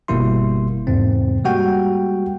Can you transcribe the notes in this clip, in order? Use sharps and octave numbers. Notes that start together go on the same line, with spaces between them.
G1 B2 G3 A#3 E4 C6
E2 G#2 C3 C4
G3 G#3 A#3 F#4 F#5 G5